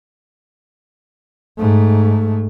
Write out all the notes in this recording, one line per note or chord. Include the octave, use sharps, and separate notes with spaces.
G#2 A3